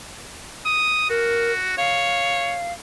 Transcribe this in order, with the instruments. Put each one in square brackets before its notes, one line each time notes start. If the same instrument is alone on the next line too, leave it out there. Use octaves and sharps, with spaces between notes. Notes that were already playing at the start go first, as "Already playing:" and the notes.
[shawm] D#6
[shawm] F#4 [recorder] A#4
[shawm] C#5 [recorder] F5